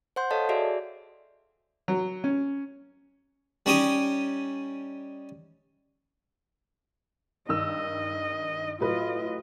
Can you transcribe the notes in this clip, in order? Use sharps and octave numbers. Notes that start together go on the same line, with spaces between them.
C5 F#5 C6 G6
A4 C#5 D#5 F5 A5
F#4 G#4 D5 E5
F#3
C#4
G3 C#4 D#4 G4 G#5 D#6
G2 D#3 D#5 E6
A2 F#3 F4 B4 D#5